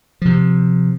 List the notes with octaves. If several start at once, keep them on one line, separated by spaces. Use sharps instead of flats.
C3 F3